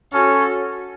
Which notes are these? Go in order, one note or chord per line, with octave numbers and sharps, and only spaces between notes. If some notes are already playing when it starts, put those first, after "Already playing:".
C#4 F#4 A4